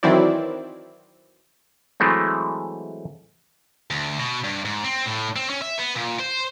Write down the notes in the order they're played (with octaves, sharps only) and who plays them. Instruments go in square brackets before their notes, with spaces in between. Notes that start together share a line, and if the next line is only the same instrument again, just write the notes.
[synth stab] D#3 E3 F#3 C4 E4 D5
[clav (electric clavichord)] E3 F#3 G#3 A3 C4
[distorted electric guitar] D2
B2
G2
G#2
C4
A2
C4
C#4
E5
B3
A#2
C5